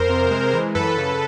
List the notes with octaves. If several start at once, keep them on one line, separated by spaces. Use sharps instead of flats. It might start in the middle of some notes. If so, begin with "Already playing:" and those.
Already playing: F2 A#4 C5
C3
G#3
E3
F#2 A4 B4
C#3